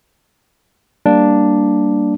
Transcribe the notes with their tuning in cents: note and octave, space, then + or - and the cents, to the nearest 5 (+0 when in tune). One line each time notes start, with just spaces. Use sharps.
G3 +0 A#3 +0 D4 +0